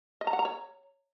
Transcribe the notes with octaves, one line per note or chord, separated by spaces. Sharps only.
D#5
A#5
F#5
A#5
C#5